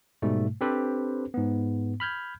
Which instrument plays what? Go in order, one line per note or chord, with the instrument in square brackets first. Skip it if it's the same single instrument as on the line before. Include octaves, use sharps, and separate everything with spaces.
[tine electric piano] G#2 B2 G3 A3
C4 D4 G4 A4 B4 C5
G#2 B3
B5 F6 G6 G#6